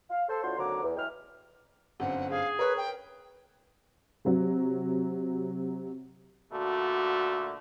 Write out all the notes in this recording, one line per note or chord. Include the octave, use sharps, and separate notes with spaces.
F5
A4 C5
A2 D4 F4 F#4 C5 C6
D#2 D3 F#3 C4 A#5 D6
E2
F#3 G#3 E4 D#5 G5 F6
G1 F#2 C4 F#5
G#4 F5
A#4 B4 C#5
G5
C3 F#3
A#2 D3 A3 F#4